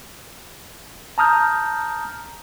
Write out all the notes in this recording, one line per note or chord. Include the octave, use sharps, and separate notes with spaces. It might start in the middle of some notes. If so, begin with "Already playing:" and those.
A5 A#5 D#6 F6 G6